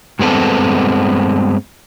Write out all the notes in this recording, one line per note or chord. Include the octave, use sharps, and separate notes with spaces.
G2 G#3 B3 C4 A4